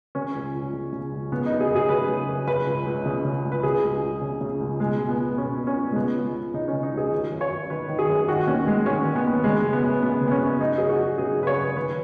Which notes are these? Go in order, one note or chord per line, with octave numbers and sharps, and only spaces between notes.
C#3 C#4
C#2
C#2
C#3
C#3
C#2
C#3 B3
F#2 D#4
G#4
F#2 G#4
C#3 B4
C#3
F#2
C#3 B4
C#2
C#2
C#3
C#3
C#2
B4
C#3 G#4
C#2
C#2
C#3
C#3
C#2
B2 G#3
C#2
B3
C#2
B2 C#4
B2
C#4
C#2
G#3
C#3 B3
C#2
C#2
C#3 D#4
C#3 C#4
D#4
C#2
G#4
D#3
F#2
C#5
F#2
D#3 B4
D#3
G#4
F#2
D#3 F#4
D#2 C#4
D#2 G#3
D#3 C#4
D#3
B3
D#2
C#3 G#3
F#2
B3
F#2
C#3 B3
C#3
B3
C#4
F#2
C#3 D#4
F#2 G#4
F#4
F#2
C#3 G#4
C#3
B4
C#5
F#2
D#3 B4